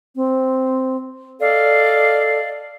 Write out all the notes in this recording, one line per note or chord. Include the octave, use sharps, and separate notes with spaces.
C4
A4 D5 D#5 F5